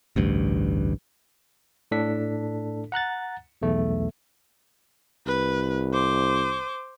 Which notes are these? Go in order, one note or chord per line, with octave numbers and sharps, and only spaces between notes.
A1 D2 G2
A2 D4 A4 B6
F#5 A#5 F#6 A6
B1 E2 A3
C2 B4
C5 D6